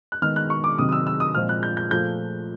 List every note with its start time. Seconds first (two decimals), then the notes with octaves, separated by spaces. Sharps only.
0.12 F#6
0.22 D#3 G#3 B3 F6
0.36 F#6
0.50 C#6
0.64 D6
0.78 C3 D#3 F#3 D#6
0.89 D#6
0.92 E6
1.07 E6
1.20 D#6
1.35 A#2 F3 G#3 C4 F6
1.49 F#6
1.63 G6
1.77 G6
1.91 A#2 F3 A3 G6